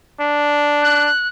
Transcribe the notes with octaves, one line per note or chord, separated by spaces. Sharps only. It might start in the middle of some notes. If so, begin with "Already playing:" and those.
D4
F#6